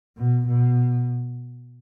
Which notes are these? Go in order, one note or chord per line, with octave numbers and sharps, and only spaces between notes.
B2
B2